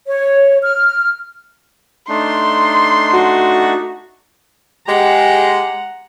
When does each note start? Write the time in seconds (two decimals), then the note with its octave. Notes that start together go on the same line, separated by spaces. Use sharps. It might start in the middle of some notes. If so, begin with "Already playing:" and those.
0.08 C#5
0.64 F6
2.09 A3 D4 D#4 C6
3.13 F#4
4.87 G#3 G4 F#5 A#5